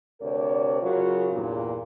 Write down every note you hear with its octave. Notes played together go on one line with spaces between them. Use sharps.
D2 C3 A#4 C#5 D5
C#3 F#3 F4 F#4 G#4 A#4
E2 G2 A#2